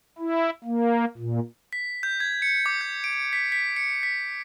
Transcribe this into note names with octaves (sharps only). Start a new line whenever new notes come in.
E4
A#3
A#2
B6
G6
G#6
C#7
D6
G6
D7
B6
B6
C#7
B6